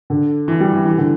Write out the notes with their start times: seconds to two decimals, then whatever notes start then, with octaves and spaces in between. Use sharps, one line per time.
0.10 D3
0.48 E3
0.60 G3
0.73 E3
0.85 E3
0.98 D3